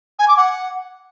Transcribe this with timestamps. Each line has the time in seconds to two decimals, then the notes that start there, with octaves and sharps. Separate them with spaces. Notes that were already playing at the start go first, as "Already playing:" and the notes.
0.19 G#5
0.28 D6
0.37 F#5